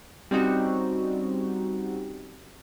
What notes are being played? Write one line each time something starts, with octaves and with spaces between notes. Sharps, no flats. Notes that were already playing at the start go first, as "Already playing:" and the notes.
G3 C4 C#4 D#4 F#4